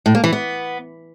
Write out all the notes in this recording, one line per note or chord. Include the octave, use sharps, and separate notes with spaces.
A2
A#3
E3
B3